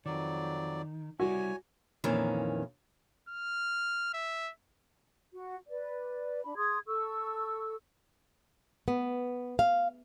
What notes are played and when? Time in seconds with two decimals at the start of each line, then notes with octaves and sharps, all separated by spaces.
0.06 F2 D#3 F#3 D5
1.20 G3 E4 F#4 C#5 G#5
2.04 F2 A#2 D#3 E3 C#4
3.29 F6
4.14 E5
5.33 F#4
5.68 B4 D5
6.44 D4 B5
6.56 G#4 C6 D#6 G#6
6.87 A4 C#6 E6
8.88 B3
9.59 F5